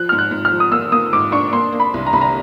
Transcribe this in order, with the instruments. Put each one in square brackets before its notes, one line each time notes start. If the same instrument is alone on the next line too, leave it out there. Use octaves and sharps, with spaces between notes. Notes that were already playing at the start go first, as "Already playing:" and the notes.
Already playing: [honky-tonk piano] F3 [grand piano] F#6
[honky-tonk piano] G#2 [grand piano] F6
[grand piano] F#6
[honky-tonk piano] G#2
[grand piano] F6
[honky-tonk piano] F3
[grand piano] D#6
[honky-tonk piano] A#3 [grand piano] E6
[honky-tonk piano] A#3 [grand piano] D#6
[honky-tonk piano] G#2 [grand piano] D6
[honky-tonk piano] D4 [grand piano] C#6
[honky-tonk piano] A#3 [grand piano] C6
[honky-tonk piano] A#3
[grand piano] B5
[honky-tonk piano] C2
[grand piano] A#5
[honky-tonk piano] C2 [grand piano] B5
[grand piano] A#5